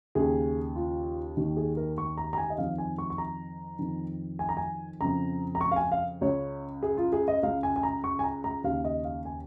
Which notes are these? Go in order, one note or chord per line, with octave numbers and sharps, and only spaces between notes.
D#2 C#3 G#4
F4
D#2 D#3
G#4
A#4
C#6
A#5
A#5
G#5
D#5
F2 D#3 F5
G#5
C#6
C#6
A#5
F2 D#3
G#5
A#5
G#5
F2 C#3 A#5
A#5
C#6
F5
G#5
F5
C#2 C#3 C#5
G#4
F4
G#4
D#5
C#2 C#3 F5
G#5
G#5
A#5
C#6
G#5
A#5
A#5
D#2 C#3 F5
D#5
F5
G#5